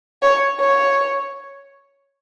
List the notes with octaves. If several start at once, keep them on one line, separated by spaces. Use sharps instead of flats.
C#5
C#5